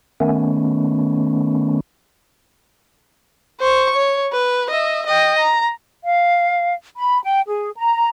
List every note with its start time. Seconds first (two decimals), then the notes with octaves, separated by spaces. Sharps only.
0.20 D#3 A3 B3 C#4
3.60 C5 C#6
3.96 C#5
4.32 B4
4.70 D#5 E5
5.06 D#5 G5
5.39 A#5
6.04 F5
6.97 B5
7.24 G5
7.47 G#4
7.76 A#5